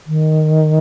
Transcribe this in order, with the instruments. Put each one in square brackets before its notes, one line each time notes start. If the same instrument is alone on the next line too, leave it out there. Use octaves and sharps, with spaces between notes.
[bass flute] D#3